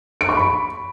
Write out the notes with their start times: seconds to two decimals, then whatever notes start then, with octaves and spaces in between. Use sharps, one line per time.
0.21 D7
0.29 C#6
0.37 B5